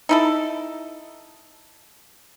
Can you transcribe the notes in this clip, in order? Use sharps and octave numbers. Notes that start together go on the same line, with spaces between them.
D#4 E4 A4